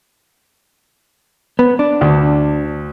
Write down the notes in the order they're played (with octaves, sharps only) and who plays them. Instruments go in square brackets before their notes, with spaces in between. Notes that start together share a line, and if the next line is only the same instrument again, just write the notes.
[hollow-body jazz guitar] B3
D4
[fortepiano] D2